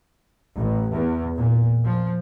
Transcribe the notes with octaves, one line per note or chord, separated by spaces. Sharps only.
A1
E2
A#2
F3